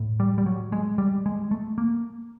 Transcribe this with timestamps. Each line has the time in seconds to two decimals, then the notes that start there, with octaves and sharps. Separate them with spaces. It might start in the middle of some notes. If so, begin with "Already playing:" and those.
Already playing: A2
0.20 G3
0.38 G3
0.46 F#3
0.72 G#3
0.98 G3
1.26 G#3
1.51 A3
1.78 A#3